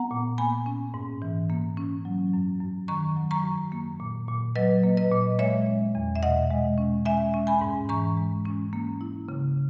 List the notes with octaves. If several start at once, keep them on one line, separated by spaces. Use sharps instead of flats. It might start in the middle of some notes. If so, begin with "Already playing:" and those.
Already playing: B3 F#5 A#5
A#2
A#3 G#5 B5
C#4
G#2
E3
A#3
C#4
F#3
F#2
F#2
D#3 A#5 C#6
F#3
A#5 C#6
F#2
A#3
A#2
A#2
F#3 B4 D#5
A#3
B4 D#5
A#2
G#3 C#5 E5
C#4
E2
E5
B2 D#5 F#5
G#3
C#4
G#3 E5 G#5
C#4
G#5 B5
G#2
E3 A#5 C#6
G#3
C#4
A#3
E4
C#3